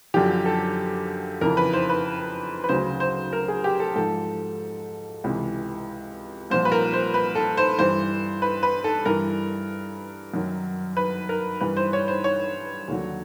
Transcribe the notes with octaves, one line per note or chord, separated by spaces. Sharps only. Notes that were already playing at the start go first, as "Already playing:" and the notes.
F#2 D3 F3 G4
A4
F2 C#3 E3 A#4
B4
C5
B4
B4
D2 C#3 F#3 C5
C5
A#4
G#4
G4
A4
G#2 F3 A4
C#2 C3 E3
C2 A#2 F3 C5
B4
A#4
C5
B4
A4
C5
G2 E3 C5
B4
B4
A4
G2 E3 A#4
F#2 D#3 F#3
B4
A#4
G2 E3 B4
C5
C#5
C5
C#5
D#2 D3 F#3